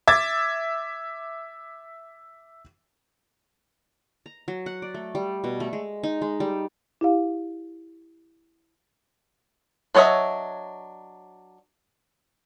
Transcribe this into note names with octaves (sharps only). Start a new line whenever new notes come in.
E5 D6 G#6 A6
A#5
F#3
F#5
D5
A3
G3
B2
A3
G#3
D#4
G#3
G3
E4 G4 F5
F#3 D4 C#5 D#5 E5